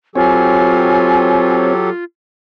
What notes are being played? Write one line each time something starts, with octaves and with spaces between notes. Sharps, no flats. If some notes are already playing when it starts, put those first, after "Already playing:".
F#3 C4 F4 G4 A4 C#5 G#5